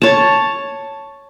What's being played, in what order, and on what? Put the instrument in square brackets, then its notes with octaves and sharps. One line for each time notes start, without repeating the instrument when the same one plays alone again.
[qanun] C#5 A5